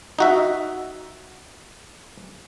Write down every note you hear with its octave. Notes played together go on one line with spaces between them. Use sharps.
D#4 F#4 E5